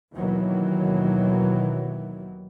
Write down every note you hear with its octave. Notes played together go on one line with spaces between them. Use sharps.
D#2 B2 D#3 E3 F#3